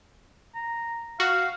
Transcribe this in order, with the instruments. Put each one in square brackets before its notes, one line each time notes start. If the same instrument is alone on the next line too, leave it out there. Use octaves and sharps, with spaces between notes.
[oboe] A#5
[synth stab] F#4 [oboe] F5